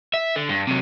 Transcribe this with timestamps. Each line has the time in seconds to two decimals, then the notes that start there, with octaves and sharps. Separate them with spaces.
0.14 E5
0.36 D3
0.49 G2
0.67 C3 F#3